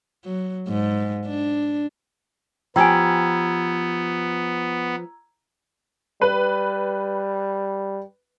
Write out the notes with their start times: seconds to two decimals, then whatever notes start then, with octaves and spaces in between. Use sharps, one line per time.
0.24 F#3
0.67 G#2
1.26 D4
2.76 F3 B3 G4 G5 G#5 A#5 E6 G#6
6.21 G3 B4